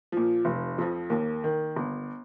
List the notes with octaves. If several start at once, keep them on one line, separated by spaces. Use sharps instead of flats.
A#2 F3
F1
F2 F3
D#2 A#3
D#3
G1